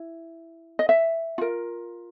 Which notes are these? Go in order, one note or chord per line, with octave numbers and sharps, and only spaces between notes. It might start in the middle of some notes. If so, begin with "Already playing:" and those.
Already playing: E4
D#5
E5
F4 A#4